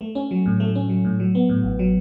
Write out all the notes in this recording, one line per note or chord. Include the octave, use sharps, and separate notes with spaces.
A3
C#4
F#3
A2
A3
C#4
F#3
A2
F#3
B3
A2
A1
F#3